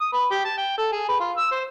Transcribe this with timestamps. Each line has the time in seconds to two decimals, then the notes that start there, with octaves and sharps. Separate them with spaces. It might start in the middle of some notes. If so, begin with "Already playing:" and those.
0.01 D#6
0.13 B4
0.31 G4
0.45 A5
0.58 G5
0.78 A4
0.92 G#4
1.09 B4
1.20 F4
1.37 E6
1.51 C5